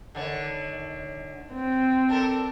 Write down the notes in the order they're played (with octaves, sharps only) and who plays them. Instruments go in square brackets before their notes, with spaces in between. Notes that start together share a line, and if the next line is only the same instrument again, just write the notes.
[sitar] D3 D#3 C#5
[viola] C4
[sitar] D4 A4 A#4